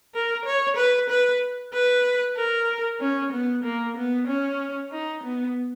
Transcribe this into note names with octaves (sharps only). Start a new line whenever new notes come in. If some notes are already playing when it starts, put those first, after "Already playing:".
A#4
C#5
B4
B4
B4
A#4
C#4
B3
A#3
B3
C#4
D#4
B3